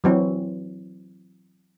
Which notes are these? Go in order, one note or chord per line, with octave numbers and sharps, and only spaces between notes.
E3 F#3 C4